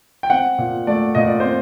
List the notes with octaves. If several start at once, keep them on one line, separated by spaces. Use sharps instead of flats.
G5
C4 F#5
A#2
A3 D5
A#2 D#5
D5
C4 C5